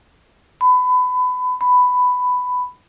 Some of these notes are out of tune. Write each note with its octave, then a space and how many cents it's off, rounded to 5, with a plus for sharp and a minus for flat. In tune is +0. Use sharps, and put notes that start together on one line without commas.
B5 +25
B5 +10